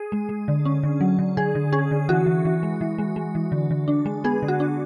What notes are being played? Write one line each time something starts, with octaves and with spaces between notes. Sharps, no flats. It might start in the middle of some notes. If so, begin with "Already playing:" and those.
Already playing: G#4
G#3
G#3
D3
C#4
D3
F#3
D3
D3 G#4
D3
C#4 G#4
D3
E3 F#4
E3
E3
G#3
E3
G#3
G#3
E3
D3
D3
D4
G#3
B3 G#4
D3
F#4
D4